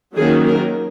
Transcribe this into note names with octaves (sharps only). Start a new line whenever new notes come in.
D#3 F#3 A#3 C#4 G#4
A#4